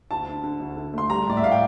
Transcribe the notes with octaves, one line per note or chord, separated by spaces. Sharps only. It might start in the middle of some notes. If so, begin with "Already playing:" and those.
D2 A5
D3
D3
D2
D3
A3 C6
G3 A#5
A2 D5
E5
A2 F5
G5